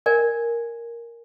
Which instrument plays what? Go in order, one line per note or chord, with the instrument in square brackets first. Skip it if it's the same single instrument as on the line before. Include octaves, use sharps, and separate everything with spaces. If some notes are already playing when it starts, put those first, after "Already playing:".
[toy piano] A#4 D5 G#5